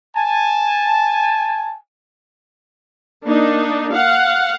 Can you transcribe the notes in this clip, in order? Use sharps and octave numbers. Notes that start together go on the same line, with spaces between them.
G#5 A5
A#3 D4 D#4
F5 F#5